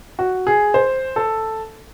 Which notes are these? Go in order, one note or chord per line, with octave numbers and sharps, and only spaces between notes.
F#4
G#4
C5
A4